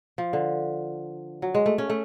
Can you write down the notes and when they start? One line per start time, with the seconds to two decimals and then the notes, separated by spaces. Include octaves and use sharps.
0.18 F3
0.33 D3
1.42 F#3
1.54 G#3
1.66 A3
1.78 C#4
1.90 A3